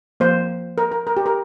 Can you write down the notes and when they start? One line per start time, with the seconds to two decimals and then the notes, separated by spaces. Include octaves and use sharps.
0.20 F3 A#3 C5
0.78 A#4
0.92 A#4
1.07 A#4
1.17 G4
1.26 A#4